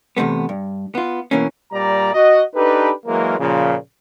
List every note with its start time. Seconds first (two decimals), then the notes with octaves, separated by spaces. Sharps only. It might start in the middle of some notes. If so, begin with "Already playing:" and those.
0.17 E2 G#2 C3 A3 B3
0.49 G2
0.95 B3 F4
1.31 B2 E3 A#3 C#4
1.72 A#2 G3 D5 A#5
2.13 F#4 D#5
2.55 D4 D#4 G4 A4 B4
3.06 E3 F#3 G#3 A#3 A#4
3.39 A#2 C#3 F3